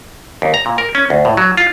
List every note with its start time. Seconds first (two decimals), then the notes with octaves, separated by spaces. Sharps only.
0.42 D#2
0.54 A#5
0.66 A#2
0.78 A#4
0.95 C#4
1.10 D2
1.25 A2
1.37 F#3
1.57 F4